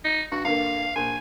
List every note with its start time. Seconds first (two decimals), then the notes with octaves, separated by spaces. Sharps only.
0.05 D#4
0.32 G2 F#4
0.45 G2 D3 A#3 F5
0.96 A#1 G#5